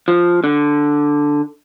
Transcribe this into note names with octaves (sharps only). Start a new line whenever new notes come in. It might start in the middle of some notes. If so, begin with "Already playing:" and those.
F3
D3